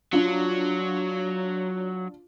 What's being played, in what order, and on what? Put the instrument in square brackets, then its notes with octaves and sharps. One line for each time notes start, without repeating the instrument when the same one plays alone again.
[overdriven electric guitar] F#3 [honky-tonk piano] D4 F4